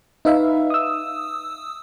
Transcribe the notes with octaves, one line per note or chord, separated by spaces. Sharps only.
D#4 B4 E5 F5
D#6 E6